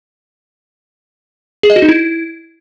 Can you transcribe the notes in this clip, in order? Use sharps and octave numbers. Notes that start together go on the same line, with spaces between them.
G#4
D#5
F#4
D#4
E4